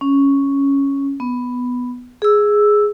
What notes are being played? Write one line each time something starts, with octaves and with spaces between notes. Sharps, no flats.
C#4
B3
G#4 E6